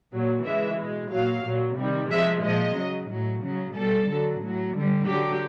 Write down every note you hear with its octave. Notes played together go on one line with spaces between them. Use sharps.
A#2 F#3
C#3 E3 G#3 E5
B2 G#3
A#2 F#3 F5
A#2 F#3
C3 D#3 G3
C3 F3 G#3 E5
A#2 F3 G#3 D#5
C#3 F#3
A2 F#3
C#3 F#3
B2 G3 A4
D3 F#3
A2 F#3
D3 G3
D3 F#3 G4